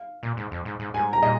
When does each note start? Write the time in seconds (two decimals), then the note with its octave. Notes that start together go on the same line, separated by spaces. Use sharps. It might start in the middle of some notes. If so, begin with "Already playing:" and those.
Already playing: F5
0.23 A#2
0.37 G#2
0.51 F2
0.65 G#2
0.79 G#2
0.94 G#2 G#5
1.13 A#5
1.23 A#2 D#5